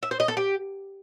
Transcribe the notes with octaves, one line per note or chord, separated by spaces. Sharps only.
E5
C5
D#5
A4
G4